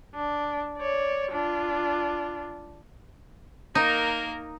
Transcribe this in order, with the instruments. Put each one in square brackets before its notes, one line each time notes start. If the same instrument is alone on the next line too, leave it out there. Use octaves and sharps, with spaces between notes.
[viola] D4
C#5 D5
D4 F4
[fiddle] A#3 A#4 [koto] D#4